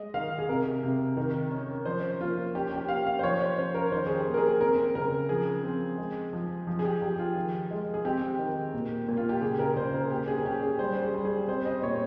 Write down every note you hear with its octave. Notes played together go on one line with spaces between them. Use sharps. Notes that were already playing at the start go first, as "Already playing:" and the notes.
Already playing: G#3 D#5
D#3 F5
G#4
C3 A#4
C3
D#3
C#4
F3 C5
A#3 F4
C#4 G4
G4
A#3 F5
F5
C5
F3 C#5
C5
C#4 C5
A#4
D#3 C5
G#4
G4
A#3
A#4
G#4
C4 A#4
C#3 A#4
F3 G#4
C4
G#3
F3
F3
G#4
G4
F3 G4
F4
D#3
G#3
G#4
C4 G4
D#3
A#2
A#2
F4
G4
C#3 G#4
A#4
C#3 C5
A#4
A#3 G4
G#4
G#4
C#4 G4
G#4
G3 C5
G#4
G3
G#4
C4 C5
D#5
A#2 C#5